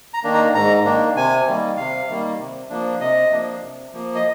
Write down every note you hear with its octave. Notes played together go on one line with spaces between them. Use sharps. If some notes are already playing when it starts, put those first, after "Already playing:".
A#5
D#3 A#3 D4
A#5
G#2 A#5
D#3 A#3 D4
C3 G#5
D#3 G3 A#3
C3 F5
D#3 G3 A#3
C3
F3 A#3 D4
C3 D#5
F3 A#3 D4
C3
F3 A#3
D#5